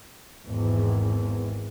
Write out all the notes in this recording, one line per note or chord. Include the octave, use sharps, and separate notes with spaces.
G#1 E2